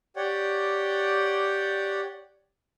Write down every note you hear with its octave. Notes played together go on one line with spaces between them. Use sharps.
G4 C#5 D5 F#5 G5